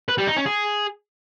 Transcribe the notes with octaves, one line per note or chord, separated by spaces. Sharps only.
B4
G3
D#4
C#4
G#4